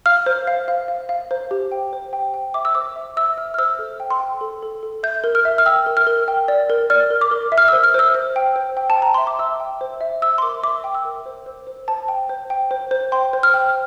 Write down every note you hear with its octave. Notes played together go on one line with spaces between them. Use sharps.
F5 F6
C5
F5
F5
F5
F5
C5
G4
G5
C5
G5
G5
E5 D6
E6
C5 D6
E5
E5 E6
E5 F6
F6
C5 E6
A4
G5
C6
G5
A4
A4
A4
E5 G6
A#4
F6
E5
F6
G5 E6
A#4
F6
A#4
G5
D5
A#4
D5 F6
A#4
D6
A#4
E5
F6
C5 E6
F6
C5 E6
C5
G5
C5
G5
A5
G5
A#5
E5 C6
D6
E5 E6
G5
C5
E5
E5 E6
C6
A#4 D6
E5 D6
G5
E6
A#4
C5
C5
C5
C5 A5
G5
C5
G5
C5
C5
G5 C6
C5
F6
G5